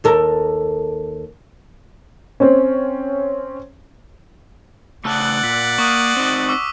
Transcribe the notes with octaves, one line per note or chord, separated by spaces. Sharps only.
D#2 A4 A#4
C4 C#4
C#3 A3 D5 F#5 A5 E6 F#6
A#2 B6
A#3 C#6 D#6 D#7
C4 D#4
C#6 D6 E6